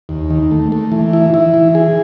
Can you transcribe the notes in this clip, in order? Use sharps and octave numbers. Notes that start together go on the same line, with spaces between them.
D#2
D#3
A3
A3
E3
E4
E4
E3
G#4